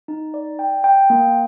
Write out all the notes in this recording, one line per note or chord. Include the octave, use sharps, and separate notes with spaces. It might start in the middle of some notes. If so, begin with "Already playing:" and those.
D#4
D5
G5
G5
A#3